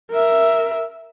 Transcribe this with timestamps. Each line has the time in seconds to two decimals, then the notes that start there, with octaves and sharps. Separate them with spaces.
0.11 A#4 E5